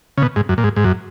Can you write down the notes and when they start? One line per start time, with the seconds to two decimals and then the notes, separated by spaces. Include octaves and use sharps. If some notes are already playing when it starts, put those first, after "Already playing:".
0.18 C#3
0.22 B2
0.36 G#2
0.49 F#2
0.58 A#2
0.64 G#2
0.76 G#2
0.84 F#2